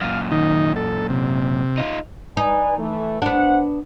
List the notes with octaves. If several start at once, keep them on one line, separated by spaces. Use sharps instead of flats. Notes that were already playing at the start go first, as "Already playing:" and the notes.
F#2 A#2 F5
D#3 D#4
A4
C3
D#4 F4
D#4 B4 D5 G#5
E3 A3
A2 B3 D4 C5 F#5